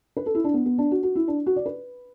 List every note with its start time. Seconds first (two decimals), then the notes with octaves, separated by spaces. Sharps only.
0.17 B4
0.26 A4
0.35 E4
0.44 D4
0.54 B3
0.66 B3
0.78 D4
0.91 F#4
1.03 F#4
1.15 E4
1.28 D4
1.46 F#4
1.56 D5
1.66 B4